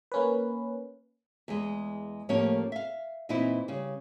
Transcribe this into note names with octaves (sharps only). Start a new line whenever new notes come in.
A#3 C#4 B4
E2 G#3
A2 F3 A#3 C#4 G4 C#5
E5 F5
A#2 E3 C4 D#4 E4
C#3 G3